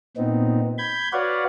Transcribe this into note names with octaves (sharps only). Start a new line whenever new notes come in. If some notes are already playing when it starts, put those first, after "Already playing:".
A#2 B3 C4 D#4
B5 G6 G#6
F#4 B4 C#5 D5 F5 F#5